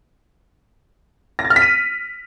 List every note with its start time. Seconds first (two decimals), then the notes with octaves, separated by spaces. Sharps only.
1.39 A#6
1.45 A6
1.50 F6
1.56 B6
1.62 D#7